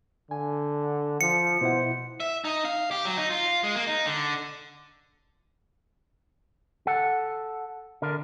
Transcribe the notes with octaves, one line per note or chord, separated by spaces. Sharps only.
D3 G#5
F3 C#7
B2 E4 C5 F#5
E5
D#4
F5
G4
F#3
D#4
F4
G#3
A#3
D#4
D3
A4 F#5
D3 A#4